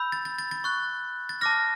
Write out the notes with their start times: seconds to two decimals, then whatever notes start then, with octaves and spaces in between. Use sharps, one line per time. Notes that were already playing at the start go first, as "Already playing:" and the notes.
Already playing: B5 E6 G6
0.12 A6
0.25 A6
0.39 A6
0.51 A6
0.64 C#6 F#6
1.29 A6
1.41 A5 D6 F6 A#6